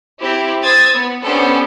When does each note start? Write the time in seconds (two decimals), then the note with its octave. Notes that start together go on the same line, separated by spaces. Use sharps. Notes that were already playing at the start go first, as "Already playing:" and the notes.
0.21 C4 E4 G4
0.62 C5 D#6 E6 G#6 A6
0.94 B3
1.24 B3 C#4 D4 G4 A4 C5